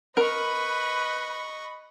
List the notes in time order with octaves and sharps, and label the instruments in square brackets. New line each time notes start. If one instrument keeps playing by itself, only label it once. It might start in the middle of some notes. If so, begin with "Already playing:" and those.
[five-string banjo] A#4 A#5 [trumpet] B4 [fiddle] D#5 C#6 [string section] B5